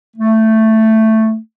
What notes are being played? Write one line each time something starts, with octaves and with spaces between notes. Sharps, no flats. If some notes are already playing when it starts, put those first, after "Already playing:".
A3